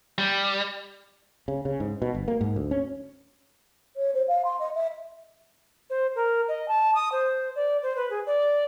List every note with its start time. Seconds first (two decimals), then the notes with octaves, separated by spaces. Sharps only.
0.18 G3
1.48 C#3
1.65 C#3
1.80 G#2
2.02 B2
2.15 G1
2.28 A#3
2.41 G#2
2.56 D2
2.71 C#4
3.96 C#5
4.14 C5
4.28 F5
4.44 C6
4.59 D#5
4.75 E5
5.90 C5
6.15 A#4
6.48 D#5
6.68 A5
6.95 D#6
7.12 C5
7.56 D5
7.83 C5
7.96 B4
8.10 G#4
8.27 D5